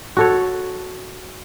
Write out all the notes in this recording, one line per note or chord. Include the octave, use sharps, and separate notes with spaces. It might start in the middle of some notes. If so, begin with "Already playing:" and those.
F#4 A4 C#5